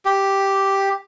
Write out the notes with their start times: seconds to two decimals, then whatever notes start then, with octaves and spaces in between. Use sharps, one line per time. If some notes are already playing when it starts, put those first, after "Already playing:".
0.05 G4